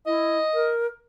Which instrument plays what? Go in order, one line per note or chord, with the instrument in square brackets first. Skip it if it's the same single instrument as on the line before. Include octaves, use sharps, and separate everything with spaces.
[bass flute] E4 [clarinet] D#5
[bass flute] A#4